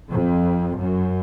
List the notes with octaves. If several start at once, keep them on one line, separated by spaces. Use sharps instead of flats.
F2
F#2